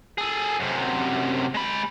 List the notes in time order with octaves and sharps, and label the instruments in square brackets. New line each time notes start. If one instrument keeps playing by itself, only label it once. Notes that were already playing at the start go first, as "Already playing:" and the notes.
[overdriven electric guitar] G#4 A4
F#2 C3
G#3 B5